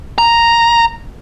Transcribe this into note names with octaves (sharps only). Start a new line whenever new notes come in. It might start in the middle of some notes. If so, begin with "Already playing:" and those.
A#5